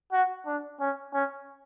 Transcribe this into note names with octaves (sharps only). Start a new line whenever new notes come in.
F#4
D4
C#4
C#4